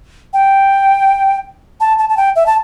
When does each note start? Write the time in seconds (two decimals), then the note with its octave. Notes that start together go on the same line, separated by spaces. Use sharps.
0.33 G5
1.80 A5
1.99 A5
2.09 A5
2.17 G5
2.36 E5
2.46 A5